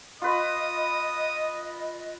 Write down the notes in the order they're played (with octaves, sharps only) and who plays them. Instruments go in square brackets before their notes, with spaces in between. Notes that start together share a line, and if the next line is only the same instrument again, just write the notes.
[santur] F4 B4 [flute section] D#5 [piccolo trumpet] D#6